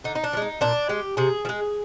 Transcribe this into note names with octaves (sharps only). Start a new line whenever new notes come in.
D3 D#4
D#4
D4
F3
G#3 D#4
A#2 D4
G#3 G4
C3 G#4
F3
G#3